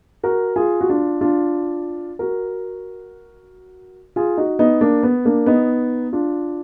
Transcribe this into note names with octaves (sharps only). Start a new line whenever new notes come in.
F#4 A#4
F4 G#4
F#4
D4 F4
D4 F4
F#4 A#4
F4 G#4
D#4 F#4
B3 D#4
A#3 D4
B3
A#3 D4
B3 D#4
D4 F4